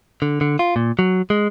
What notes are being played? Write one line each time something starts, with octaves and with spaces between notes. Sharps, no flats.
D3
D3
F4
A#2
F#3
G#3